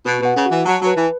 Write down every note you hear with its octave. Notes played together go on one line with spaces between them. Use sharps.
B2 B4
B2 F#5
C#3
E3 F#4
F#3 A5
F#3 B4
E3